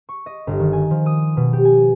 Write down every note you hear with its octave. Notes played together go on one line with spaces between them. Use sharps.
C#6
D#5
G1
D#3
G#5
F3
D#6
B2
G4
G#5